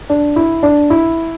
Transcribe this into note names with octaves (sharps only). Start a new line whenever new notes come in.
D4
E4
D4
E4